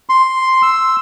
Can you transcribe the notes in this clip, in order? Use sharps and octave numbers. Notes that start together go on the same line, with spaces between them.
C6
E6